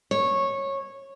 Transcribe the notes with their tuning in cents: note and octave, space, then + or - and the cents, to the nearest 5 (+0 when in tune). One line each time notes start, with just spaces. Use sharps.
C#5 -15